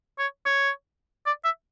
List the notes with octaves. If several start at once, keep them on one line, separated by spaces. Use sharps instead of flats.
C#5
C#5
D5
E5